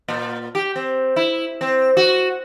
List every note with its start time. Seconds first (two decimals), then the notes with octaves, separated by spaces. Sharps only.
0.08 A#2
0.55 G4
0.76 C4
1.16 E4
1.61 C4
1.97 F#4